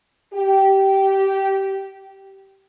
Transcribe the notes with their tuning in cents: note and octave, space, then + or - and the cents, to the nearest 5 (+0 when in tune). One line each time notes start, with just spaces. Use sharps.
G4 -15